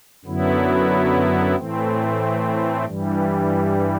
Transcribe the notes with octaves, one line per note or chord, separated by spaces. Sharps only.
F#2 D3 F#3 B3 E4
A2 E3 A3 C4
G2 E3 G3